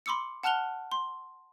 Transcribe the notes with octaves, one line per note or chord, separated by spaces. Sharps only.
B5 C6 D6 E6 C#7
F#5 A5 F6 F#6 F7 G7
C6